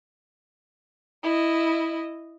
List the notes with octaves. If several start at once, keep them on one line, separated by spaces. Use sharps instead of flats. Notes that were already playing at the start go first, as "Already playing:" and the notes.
E4 D#5